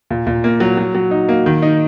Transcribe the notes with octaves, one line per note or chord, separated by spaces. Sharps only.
A#2
A#2
A#3
F#3
F#3
F#3
D#4
A#3
D#3
D#4